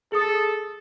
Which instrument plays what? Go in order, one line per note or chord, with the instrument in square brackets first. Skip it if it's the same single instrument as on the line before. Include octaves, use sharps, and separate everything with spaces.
[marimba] G#4 D#6 [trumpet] A4